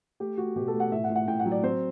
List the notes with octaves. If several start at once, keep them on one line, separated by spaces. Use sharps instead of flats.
A3 G4
A3 F#4
B2 G4
A4
A3
F#5
A2 E5
F#5
A2
F#5
A2 G5
F#5
F#3
D5
C4 C5